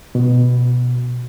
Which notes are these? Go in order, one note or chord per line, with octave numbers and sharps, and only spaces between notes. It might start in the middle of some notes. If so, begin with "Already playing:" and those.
B2